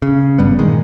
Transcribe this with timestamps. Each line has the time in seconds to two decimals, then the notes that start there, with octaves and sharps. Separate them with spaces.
0.02 C#3
0.38 G#1 G2 G3 B3
0.59 A#2 D#3 G#3